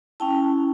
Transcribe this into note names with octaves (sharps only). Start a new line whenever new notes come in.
C#4 E4 G5 A5